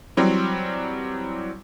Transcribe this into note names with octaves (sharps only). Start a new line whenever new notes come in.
E3 F#3 G3 C4